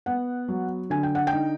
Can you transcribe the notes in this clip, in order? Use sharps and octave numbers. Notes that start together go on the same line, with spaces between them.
B3 F#5
F#3
D3 G#5
G5
F#5
G5
D#4